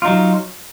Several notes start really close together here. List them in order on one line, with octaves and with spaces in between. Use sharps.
F4 D#4 F#3